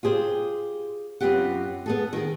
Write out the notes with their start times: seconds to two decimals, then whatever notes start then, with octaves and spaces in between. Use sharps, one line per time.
0.03 F4 G4 G#4 C5
1.21 F#2 B3 C4 F4 G4 F#5
1.86 B3 G#4 A4
2.13 D#3 G#4